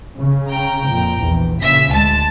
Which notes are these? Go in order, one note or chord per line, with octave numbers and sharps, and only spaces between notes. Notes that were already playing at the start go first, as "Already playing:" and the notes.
C#3
G5 A#5
F2 A#2
A#1 E2
A#2 C#3 E5 B6
D2 G#3 A5